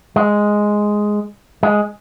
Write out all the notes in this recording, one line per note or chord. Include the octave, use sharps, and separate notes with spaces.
G#3
G#3